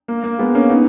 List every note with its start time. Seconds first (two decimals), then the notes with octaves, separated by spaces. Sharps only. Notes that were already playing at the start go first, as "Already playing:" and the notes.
0.08 A#3
0.24 A#3
0.39 G#3 B3
0.55 A#3 C#4
0.70 B3 D#4